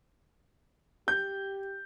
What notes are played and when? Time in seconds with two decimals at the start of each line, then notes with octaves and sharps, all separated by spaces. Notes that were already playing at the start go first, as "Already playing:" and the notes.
1.08 G4 G6